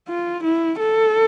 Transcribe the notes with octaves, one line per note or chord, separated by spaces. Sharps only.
F4
E4
A4